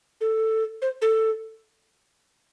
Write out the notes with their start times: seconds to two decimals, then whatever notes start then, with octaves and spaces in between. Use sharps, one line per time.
0.21 A4
0.82 C5
1.02 A4